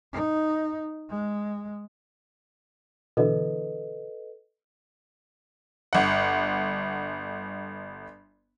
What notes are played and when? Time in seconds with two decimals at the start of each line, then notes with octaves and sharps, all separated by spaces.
0.13 D#4
1.10 G#3
3.17 B2 D3 E3 A4 B4 D#5
5.93 G1 F#5